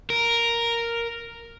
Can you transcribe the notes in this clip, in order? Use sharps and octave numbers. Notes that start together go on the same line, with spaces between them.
A#4